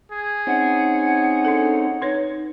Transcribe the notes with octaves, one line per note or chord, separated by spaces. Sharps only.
G#4
C4 C#4 D#4 F#5
D4 A4
D#4 B4 C#5